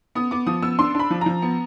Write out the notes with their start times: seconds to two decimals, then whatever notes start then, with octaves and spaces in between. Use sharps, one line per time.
0.15 B3 D#6
0.31 B3 D6
0.47 F3 D#6
0.62 B3 E6
0.79 D4 C6
0.95 D4 B5
1.11 F3
1.21 F3 A#5
1.42 B3